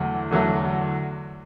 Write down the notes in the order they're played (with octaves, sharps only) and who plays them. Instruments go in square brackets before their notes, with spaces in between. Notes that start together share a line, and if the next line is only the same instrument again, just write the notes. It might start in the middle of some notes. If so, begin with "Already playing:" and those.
Already playing: [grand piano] E2 D3 F#3 A3
E2 D3 F#3 A3